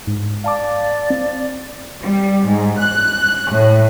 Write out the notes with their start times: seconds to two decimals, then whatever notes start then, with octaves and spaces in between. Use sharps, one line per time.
0.07 G#2
0.44 D5 F5 A5 D6
1.10 C4
2.01 G3
2.46 G#2
2.79 F#6
3.52 A2